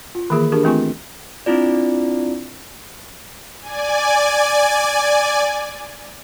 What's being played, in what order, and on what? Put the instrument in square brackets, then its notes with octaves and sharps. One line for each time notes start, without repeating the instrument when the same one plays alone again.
[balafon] F4
D#3 E3 A#3 G#4
D4 G4 G#4 A#4
E3 A3 C4 F4 G#5 C#6
[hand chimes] C4 D4 E4 F4 D5
[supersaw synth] D5 G#5